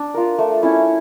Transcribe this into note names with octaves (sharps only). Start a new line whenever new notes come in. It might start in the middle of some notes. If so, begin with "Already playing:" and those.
Already playing: D4
F4 A#4
A3
C#4 E4